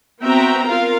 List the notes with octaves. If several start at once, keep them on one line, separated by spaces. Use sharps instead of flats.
B3 C4 F#4 E5 G5 A#5
F4 A#4 F5